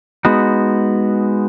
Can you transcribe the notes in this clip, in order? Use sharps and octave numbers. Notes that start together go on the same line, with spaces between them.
G#3 B3 D#4 F#4